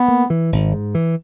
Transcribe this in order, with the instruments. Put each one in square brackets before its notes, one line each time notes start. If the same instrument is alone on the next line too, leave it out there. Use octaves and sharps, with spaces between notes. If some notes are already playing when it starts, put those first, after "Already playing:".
Already playing: [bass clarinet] B3
[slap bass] A#3
E3
G#1
G#2
E3